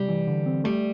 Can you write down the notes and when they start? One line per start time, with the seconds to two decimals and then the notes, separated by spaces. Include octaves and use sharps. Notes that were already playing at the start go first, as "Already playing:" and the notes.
Already playing: C3 G3
0.09 E3
0.27 D3
0.46 C4
0.64 G3 A3